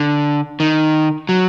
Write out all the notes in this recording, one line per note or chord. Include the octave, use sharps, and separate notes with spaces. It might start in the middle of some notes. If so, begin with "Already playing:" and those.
Already playing: D3
D#3
F#3